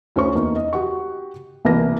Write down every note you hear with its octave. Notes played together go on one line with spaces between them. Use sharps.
D2 C#4 C5 C#6
E2 A#3 D#4
D#5
F#4 G4 F#5 C#6
C2 B2 E3 A#3 B4 A#6